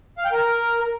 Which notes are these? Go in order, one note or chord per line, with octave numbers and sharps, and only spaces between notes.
F5
G5
A#4